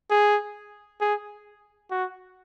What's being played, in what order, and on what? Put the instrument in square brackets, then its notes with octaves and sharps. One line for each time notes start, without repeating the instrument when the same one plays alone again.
[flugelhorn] G#4
G#4
F#4